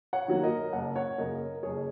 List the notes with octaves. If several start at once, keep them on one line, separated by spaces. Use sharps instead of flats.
C#5 F#5
D#3 F#3 A#3
A#4 D#5
F#1 F#5
C#5 F#5
F#2 C#3 A#3 A#4 D#5
A#4
F#1 G#4 C#5